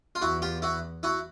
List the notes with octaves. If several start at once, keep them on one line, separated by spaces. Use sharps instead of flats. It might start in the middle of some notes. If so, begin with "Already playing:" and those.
F4
E2 E4 F#4
F4 G4
E4 F#4
E4 F#4